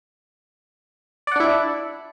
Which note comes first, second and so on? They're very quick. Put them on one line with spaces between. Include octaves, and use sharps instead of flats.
D5 F#5 D4 E4